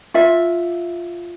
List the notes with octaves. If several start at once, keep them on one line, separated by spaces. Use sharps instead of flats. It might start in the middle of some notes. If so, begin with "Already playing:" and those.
F4 E5